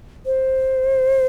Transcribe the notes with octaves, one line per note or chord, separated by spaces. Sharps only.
C5